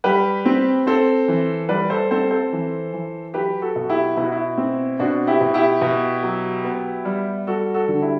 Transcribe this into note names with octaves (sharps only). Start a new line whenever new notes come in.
G3 G4 B4
C4
C4 A4 C5
E3
G3 B4 D5
A4 C5
C4 A4 C5
A4 C5
E3
E3
F#3 G4 B4
F#4 A4
B2
E4 G4
B2 E4
F#4
E4
C4
B2 D4 F#4
E4 G4
B2
E4 G4
B2
F#3
B3
G3
G3 F#4 A4
F#4 A4
D3
E4 G4